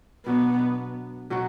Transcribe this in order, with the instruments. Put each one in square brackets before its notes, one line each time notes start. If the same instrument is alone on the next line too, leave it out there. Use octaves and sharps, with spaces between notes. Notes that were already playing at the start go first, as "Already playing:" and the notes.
[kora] B2 F#3 D4 F#4 [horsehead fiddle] B3
[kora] B2 F#3 B3 F#4